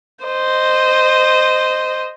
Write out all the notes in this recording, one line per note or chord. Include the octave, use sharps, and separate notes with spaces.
C5 D#5